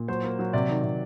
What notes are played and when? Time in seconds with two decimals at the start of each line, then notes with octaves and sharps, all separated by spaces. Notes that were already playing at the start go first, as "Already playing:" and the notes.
Already playing: A#2
0.08 F#3 C5
0.24 A#3
0.39 F#3
0.53 C3 D5
0.69 D#3
0.84 C3